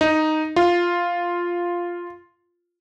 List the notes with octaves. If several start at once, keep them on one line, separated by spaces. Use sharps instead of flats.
D#4
F4